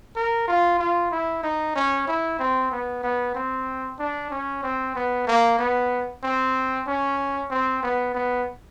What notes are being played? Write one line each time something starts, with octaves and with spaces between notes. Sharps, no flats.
A#4
F4
F4
E4
D#4
C#4
E4
C4
B3
B3
C4
D4
C#4
C4
B3
A#3
B3
C4
C#4
C4
B3
B3